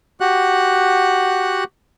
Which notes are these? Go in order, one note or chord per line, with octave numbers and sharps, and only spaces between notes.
F#4 G4 F#5 F#6